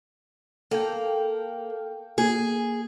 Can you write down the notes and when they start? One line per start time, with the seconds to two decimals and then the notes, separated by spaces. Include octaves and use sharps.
0.71 A#3 A4 F5 G5
2.18 A#3 G#4